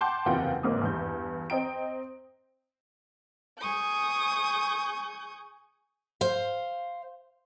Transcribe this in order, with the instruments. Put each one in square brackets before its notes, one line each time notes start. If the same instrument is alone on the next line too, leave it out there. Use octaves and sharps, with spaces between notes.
[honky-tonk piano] F#5 G5 A5 C6 D6 G6
F#1 E2 C3 F4 F#5 G5
A1 G#2 C#3 A#3 C4 D#6
E2 G2 G6
C4 D#5 G5 A#5 D7
[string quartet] G#4 C#6 D#6 G6
[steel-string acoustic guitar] C5 F5